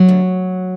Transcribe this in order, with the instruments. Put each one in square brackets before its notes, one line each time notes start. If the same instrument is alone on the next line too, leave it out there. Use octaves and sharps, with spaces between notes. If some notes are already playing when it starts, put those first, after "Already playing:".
Already playing: [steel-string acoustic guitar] F#3
D2